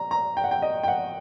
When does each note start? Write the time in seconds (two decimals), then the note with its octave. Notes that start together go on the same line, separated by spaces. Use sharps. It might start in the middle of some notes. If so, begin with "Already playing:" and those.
Already playing: A#5
0.11 A#5
0.37 G5
0.44 F#5
0.51 G5
0.62 D#5
0.83 G5
0.88 F#5